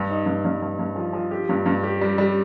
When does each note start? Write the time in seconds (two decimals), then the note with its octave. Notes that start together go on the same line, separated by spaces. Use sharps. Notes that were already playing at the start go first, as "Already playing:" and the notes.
Already playing: G2
0.09 D#4
0.26 G2
0.45 G2
0.62 G2
0.79 G2
0.96 F3
1.13 F3
1.31 G4
1.49 G2
1.66 G2
1.83 G4
2.01 G3
2.18 G3